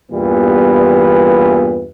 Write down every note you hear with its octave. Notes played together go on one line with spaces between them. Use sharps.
E2 G2 A#2 E3 G3 B3